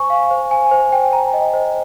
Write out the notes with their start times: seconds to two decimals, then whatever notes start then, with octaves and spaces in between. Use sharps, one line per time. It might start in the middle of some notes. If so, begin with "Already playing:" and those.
Already playing: C5 G#5 C#6
0.10 F5
0.31 C5
0.51 G#5
0.71 C5
0.92 G5
1.13 A#5
1.33 D#5
1.54 C5